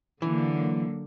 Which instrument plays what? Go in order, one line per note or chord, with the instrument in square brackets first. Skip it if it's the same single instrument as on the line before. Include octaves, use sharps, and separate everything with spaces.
[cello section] D3 F#3 A#3 [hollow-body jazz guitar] E3